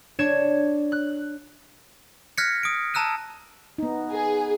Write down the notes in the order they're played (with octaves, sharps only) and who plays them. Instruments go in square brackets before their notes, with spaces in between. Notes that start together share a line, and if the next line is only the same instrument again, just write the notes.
[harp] D4 C#5 G#6 E7
F#6
[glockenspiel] F6 F#6 G#6 A#6 B6 C#7
D#6 D7
A5 A#5 E6 F#6 D#7
[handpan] B3 D#4
[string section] G#4